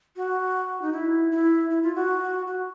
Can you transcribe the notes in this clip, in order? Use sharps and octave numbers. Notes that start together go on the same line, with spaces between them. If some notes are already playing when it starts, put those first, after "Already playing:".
F#4
D#4
E4
E4
E4
F4
F#4
F#4